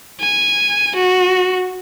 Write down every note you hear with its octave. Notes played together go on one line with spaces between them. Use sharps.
G#5
F#4